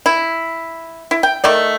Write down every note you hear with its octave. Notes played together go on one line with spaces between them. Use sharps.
E4
E4
G5
D#3 A3 D5